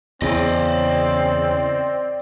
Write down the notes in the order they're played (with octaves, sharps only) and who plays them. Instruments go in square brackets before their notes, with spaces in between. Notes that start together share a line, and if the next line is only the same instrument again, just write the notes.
[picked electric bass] E2 [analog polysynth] C#3 [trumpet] C4 [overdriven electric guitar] D5 D#5